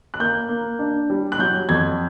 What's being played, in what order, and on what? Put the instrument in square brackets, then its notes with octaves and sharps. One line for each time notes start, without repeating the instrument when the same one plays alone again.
[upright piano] F#6
A#3 G6
A#3
D4
G3
F#6
F#3 G6
F2 G#6